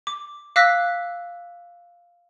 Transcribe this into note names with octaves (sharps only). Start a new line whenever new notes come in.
D6
F5 D6 E6 F#6 A#6 B6